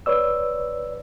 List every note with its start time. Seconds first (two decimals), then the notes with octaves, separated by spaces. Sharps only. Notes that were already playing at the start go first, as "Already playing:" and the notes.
0.06 B4 C#5 D5 E6